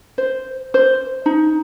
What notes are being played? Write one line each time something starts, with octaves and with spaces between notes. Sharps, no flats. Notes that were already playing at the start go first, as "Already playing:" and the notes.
C5
C5
D#4